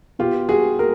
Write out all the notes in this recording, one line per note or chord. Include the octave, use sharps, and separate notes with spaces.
B2 F4 G4
G3 F#4 G#4
G#4 A#4